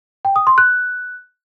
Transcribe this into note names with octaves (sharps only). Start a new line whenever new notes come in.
G5
D#6
C6
F#6